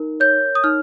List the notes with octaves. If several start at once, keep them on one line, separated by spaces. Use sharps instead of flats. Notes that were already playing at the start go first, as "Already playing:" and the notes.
Already playing: D#4 A#4
C#5 G6
D#6
D#4 F6